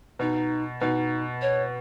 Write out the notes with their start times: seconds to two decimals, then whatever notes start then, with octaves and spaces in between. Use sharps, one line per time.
0.19 B2 D#4
0.81 B2 D#4
1.42 C#5